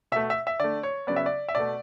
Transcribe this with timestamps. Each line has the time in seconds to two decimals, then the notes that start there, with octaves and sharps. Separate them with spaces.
0.12 B2 E5
0.16 A3
0.30 E5
0.47 E5
0.59 D3 A3 D5
0.83 C#5
1.07 C#3 F#3 B3 D5
1.16 E5
1.26 D5
1.49 E5
1.55 B2 A3 D5